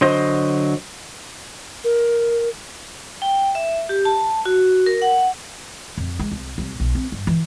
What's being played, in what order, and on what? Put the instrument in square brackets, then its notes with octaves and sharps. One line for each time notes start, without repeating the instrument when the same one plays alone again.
[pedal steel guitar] D3 F#3 C5 D#5
[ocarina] A#4
[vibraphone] G5
E5
G4
A5
F#4
A#4
F#5
[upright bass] F2
G#3
C2
C2
B1
C4
G2
E3